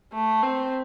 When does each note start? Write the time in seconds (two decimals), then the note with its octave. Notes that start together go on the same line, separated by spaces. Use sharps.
0.13 A3
0.43 C4